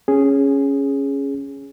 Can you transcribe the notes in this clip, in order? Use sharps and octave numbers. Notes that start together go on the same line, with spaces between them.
C#4 G#4